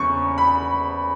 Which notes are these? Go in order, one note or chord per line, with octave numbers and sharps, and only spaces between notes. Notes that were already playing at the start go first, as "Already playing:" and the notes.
Already playing: E2 C#3 C#6
B5